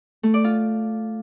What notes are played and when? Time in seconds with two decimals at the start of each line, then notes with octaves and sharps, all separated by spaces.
0.23 A3
0.34 D5
0.44 F4